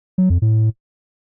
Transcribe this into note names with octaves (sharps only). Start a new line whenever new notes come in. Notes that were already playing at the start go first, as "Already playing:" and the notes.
F#3
F2
A2